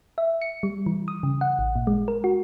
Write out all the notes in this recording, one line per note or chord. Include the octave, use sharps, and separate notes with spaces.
E5
C#7
G3
E3
D#6
C#3
F#5
A1
A#2
G#3
A#4
F#4